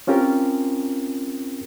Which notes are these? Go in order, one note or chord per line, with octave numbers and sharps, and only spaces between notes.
C4 C#4 F4 G4 A#4